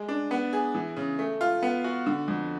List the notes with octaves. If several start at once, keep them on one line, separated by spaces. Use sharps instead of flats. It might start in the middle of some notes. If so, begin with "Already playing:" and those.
Already playing: G#3
D4
B3
G#4
E3
C#3
A3
F4
B3
F#4
D3
F2